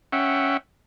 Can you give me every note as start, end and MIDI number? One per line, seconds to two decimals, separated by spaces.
0.13 0.57 61
0.13 0.57 76
0.13 0.57 78
0.13 0.57 79